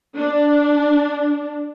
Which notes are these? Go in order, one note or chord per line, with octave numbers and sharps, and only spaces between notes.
D4